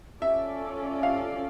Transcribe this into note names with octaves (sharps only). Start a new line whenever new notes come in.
C#4 F4 A4 D5 E5
F5